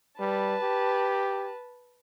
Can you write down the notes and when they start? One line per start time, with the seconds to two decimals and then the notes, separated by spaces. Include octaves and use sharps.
0.19 G3 B4 A5
0.62 G4